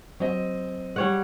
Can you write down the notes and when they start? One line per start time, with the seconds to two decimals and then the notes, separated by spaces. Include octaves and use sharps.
0.20 F#3 C4 D#5
0.96 G3 C#5 F#5